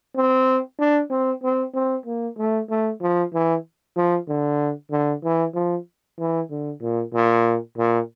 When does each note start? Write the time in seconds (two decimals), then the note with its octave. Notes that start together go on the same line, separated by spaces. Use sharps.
0.16 C4
0.79 D4
1.10 C4
1.43 C4
1.74 C4
2.06 A#3
2.38 A3
2.70 A3
3.01 F3
3.34 E3
3.96 F3
4.28 D3
4.91 D3
5.24 E3
5.55 F3
6.19 E3
6.50 D3
6.81 A#2
7.13 A#2
7.78 A#2